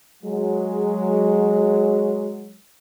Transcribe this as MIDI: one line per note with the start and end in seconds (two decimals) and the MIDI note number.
0.23 2.57 54
0.23 2.57 56